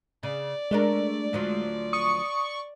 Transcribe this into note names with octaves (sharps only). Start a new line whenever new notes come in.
C#3 D5
G#3 A3 D4 A#4
D2 F3 F#3
C#6 D#6